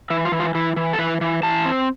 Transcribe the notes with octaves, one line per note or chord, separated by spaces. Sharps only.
E3 E4
F4
E3
F4
E3 E4
E3
A4
E3 B4
E3
E3 A5
C4